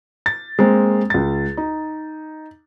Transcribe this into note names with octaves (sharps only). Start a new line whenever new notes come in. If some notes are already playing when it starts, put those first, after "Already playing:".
A6
G#3 A#3 C4
C#2 A6
D#4